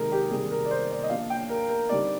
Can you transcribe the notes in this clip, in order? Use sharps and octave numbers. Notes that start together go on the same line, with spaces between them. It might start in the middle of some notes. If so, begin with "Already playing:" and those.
Already playing: C3 D#3 G#3 G#4 A#4
G4
C3 D#3 G3 G#4
A#4
D5
C5
D5
D#5
F3 A#3 D4 F4 F5
G5
A#4
A#4
D3 G3 C4 D#4 D5